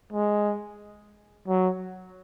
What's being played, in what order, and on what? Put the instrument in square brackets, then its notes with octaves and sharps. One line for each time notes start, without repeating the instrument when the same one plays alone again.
[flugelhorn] G#3
F#3